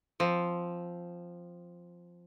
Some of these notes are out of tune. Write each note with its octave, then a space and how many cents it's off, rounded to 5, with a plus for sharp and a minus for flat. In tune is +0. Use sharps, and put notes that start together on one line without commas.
F3 +0 C4 +0